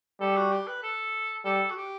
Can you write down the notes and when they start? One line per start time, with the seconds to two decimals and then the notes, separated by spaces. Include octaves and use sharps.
0.21 G3 A4
0.37 F#4
0.52 G4
0.67 B4
0.83 A4
1.45 G3 A4
1.70 F#4
1.76 G4